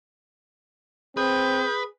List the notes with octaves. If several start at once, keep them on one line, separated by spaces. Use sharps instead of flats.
C4 G#4 B4 G6